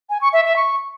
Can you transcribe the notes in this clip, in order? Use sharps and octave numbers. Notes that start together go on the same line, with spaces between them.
G#5
C#6
E5
E5
C#6